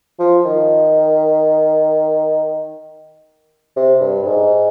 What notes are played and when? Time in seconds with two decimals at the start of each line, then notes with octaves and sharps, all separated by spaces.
0.19 F3
0.45 D#3
3.76 C3
4.01 G2
4.23 G2
4.27 G#2